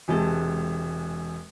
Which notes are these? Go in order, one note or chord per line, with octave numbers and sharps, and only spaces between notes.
E1 C3 G#3 A5